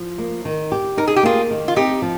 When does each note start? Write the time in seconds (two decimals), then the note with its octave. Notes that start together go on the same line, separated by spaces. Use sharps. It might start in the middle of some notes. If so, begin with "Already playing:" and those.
Already playing: F3
0.18 A#3
0.45 D#3
0.72 G4
0.97 D#4 A#4
1.07 G#4
1.16 G4
1.23 A#3 F4 G#4
1.51 D#3
1.68 F4
1.76 C4 D#4 G4
2.02 F3